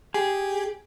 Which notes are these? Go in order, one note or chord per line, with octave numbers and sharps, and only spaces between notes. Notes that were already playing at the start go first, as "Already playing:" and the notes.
G4 G#4